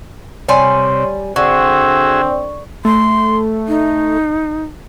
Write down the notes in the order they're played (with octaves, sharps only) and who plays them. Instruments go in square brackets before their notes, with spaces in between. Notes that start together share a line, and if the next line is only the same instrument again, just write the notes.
[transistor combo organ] C3 [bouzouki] G3 D5 G#5 [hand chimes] C#5 C6
[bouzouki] D3 [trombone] C4 [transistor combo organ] F#4 G#4 E5 [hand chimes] C#6
[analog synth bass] A3 [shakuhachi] C6
[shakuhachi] D#4